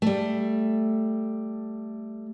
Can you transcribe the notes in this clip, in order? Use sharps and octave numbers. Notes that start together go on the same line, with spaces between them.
G3 A3